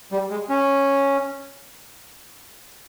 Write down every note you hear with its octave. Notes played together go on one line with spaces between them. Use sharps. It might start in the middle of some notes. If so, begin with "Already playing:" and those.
G3
G#3
C#4